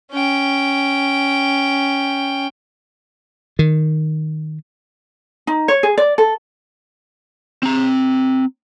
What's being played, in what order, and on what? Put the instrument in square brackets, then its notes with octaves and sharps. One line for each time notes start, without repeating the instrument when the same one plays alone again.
[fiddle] C#4 G5
[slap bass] D#3
[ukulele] D#4
C#5
G#4
D5
A4
[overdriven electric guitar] C4 A#5